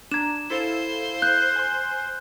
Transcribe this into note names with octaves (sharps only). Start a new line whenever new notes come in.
D4 A#5 G#6 E7
E4 A4 C5 F5
F#6 G6
G#5 C6